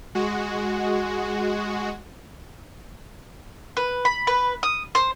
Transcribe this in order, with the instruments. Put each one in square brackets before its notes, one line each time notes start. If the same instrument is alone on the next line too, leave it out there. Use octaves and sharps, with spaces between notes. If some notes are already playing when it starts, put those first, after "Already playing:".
[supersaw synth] G#3 F#4
[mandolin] B4
B5
B4
D#6
C5